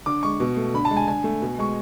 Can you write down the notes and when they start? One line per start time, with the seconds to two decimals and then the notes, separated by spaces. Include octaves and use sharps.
0.06 D3 D6
0.23 G#3 C#6
0.40 B2
0.57 A3
0.74 D3 B5
0.85 A5
0.91 G#3
0.97 G#5
1.08 D3 G#5
1.24 A3
1.42 B2
1.59 G#3 C#6